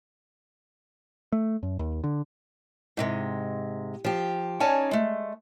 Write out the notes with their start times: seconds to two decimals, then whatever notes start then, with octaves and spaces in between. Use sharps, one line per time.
1.32 A3
1.63 F#2
1.79 D#2
2.04 D3
2.97 G#2 C3 G#3
4.04 F3 G4
4.60 C#4 D#4 C#5 D5 G#5 A5
4.91 G#3 A3